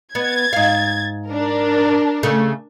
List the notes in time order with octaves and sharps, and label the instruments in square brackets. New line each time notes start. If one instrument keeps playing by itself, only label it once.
[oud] B3 [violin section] G#6 A6
[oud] G#2 F5
[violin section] D4 A#4
[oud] C#3 A3